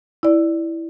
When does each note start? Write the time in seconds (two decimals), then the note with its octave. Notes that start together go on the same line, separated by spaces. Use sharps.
0.23 E4 D5